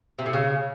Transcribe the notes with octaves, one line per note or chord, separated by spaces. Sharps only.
C3
A2
C#3